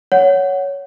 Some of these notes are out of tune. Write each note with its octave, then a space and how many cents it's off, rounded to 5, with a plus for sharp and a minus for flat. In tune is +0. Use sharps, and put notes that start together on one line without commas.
C#5 +10 F#5 +0